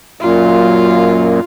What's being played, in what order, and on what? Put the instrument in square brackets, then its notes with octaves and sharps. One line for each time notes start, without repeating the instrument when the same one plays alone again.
[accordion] F#2 A#2 [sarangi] F4